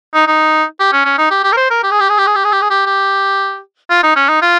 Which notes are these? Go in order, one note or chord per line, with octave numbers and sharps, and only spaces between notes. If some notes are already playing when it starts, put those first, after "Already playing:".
D#4
D#4
G4
C#4
C#4
D#4
G4
G4
A#4
C5
A#4
G4
G#4
G4
G#4
G4
G#4
G4
G#4
G4
G#4
G4
G4
F4
D#4
C#4
D#4
F4